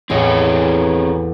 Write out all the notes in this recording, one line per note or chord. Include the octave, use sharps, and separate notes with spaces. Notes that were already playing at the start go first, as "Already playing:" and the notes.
A1 E2 C4 G#4 C#5 D#5